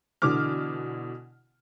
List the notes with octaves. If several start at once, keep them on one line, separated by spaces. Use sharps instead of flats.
B2 D3 E3 D6 F6